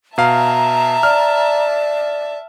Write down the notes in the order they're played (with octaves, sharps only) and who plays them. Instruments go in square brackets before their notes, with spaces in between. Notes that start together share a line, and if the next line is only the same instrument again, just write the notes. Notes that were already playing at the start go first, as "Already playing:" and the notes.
[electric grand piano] B2 F5 [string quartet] E5 A5 [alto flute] A#5
[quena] D5 [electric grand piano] F6